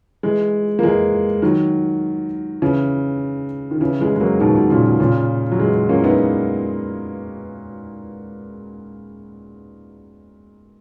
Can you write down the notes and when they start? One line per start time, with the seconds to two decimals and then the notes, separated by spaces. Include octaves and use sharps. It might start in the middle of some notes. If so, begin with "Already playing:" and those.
0.23 E3 G#3
0.79 A#3
0.83 E3 G#3
1.42 D#3 F#3
2.62 C#3 E3
3.71 D#3
3.81 C#3 E3
4.01 E3 G#3
4.16 G#3
4.20 F#3 A#3
4.40 B2 D#3
4.55 B2
4.70 A#2 C#3
4.85 B2
5.00 A#2 C#3
5.51 F#3
5.59 E3 G#3
5.89 A#3 C#4
5.99 E4
6.04 B3 D#4